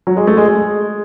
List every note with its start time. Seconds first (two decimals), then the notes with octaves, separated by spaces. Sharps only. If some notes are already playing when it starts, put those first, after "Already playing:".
0.07 F#3
0.17 G#3
0.27 A3
0.37 G#3
0.48 G#3